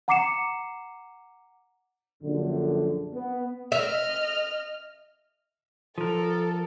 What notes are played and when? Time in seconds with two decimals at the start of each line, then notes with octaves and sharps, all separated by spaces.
0.08 F#5 A#5 D6 C7 C#7 E7
2.23 A#1 F#2 D3
3.14 B3
3.72 D#5 E5 F6
5.98 F3 A4 A#4